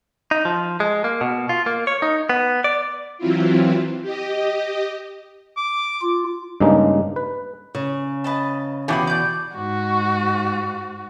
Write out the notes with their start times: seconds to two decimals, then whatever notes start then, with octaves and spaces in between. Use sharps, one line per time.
0.31 D#4
0.45 F3
0.80 G#3
1.04 A#3
1.21 B2
1.49 F4
1.66 A#3
1.87 C#5
2.02 D#4
2.29 B3
2.64 D5
3.18 E3 F#3 C4 E4 F4
4.02 G4 D#5
5.57 D6
6.01 F4
6.60 G2 C#3 G#3 A#3 D4 D#4
7.16 B4
7.75 C#3
8.24 B4 D#5 A5
8.88 E2 B2 G4 F5 B5
9.07 D5 G6
9.56 G#2 F#4